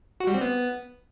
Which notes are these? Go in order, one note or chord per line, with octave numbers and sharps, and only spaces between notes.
F#4
G3
C4
B3